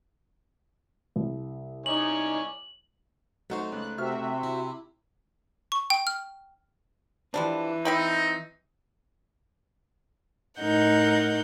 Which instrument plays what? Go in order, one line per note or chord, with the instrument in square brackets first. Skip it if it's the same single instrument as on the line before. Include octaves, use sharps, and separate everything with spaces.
[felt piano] C2
[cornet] D#4 [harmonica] C#5 D5 G#5 [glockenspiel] F#7
[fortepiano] F#3 F#5 C#6 [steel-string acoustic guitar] A3 D#4 C5
[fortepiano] C#2 [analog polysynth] F#6
[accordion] C3 [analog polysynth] C4 F#4 E5 [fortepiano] C#6 F6
[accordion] C3
[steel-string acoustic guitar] E4
[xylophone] C#6
G5
F6
[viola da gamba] E3 [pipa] F3 G3 D4
[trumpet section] C4 D#4 D#5 [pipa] E5 G5 B5
[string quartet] A2 D#4 A#4 F#5 G6